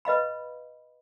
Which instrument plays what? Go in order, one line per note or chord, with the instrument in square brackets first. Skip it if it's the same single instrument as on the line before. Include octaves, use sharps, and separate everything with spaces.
[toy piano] B4 D#5 F5 B5